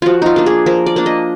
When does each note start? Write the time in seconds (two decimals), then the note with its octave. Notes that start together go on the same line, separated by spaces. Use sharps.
0.02 F3 F4 F#4
0.22 D#4 F4
0.36 A#3 D4
0.46 G#4
0.66 F3 A#4
0.86 D5
0.96 A#3 D4
1.06 D#5